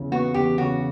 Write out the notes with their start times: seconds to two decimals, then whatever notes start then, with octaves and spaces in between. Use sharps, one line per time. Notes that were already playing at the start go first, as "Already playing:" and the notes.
Already playing: E2 C#3 E3
0.12 B3 F#4
0.34 E2 G4
0.58 C#3 F#4